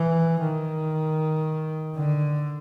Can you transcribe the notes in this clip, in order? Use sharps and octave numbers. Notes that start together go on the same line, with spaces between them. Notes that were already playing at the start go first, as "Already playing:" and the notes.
Already playing: E3
D#3
D3